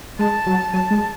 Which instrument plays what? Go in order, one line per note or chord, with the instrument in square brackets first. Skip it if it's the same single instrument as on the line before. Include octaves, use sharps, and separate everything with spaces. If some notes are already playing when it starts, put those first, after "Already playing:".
[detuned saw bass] G#3 [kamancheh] A5
[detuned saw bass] F#3
[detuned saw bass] F#3 [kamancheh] A5
[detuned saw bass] G#3